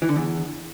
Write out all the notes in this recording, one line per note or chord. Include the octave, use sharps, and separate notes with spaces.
E3
D3
E2